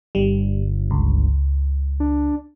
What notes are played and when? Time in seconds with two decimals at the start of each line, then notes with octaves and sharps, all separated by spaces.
0.15 G1 G3
0.91 C#2
2.00 D4